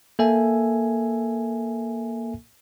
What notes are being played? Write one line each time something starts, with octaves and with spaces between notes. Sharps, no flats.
A#3 A4 E5 G#5